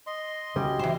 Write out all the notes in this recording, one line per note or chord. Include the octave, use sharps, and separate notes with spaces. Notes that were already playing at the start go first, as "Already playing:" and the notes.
D#5 C6
C2 C#3 G3 F#4 G5
E3 C5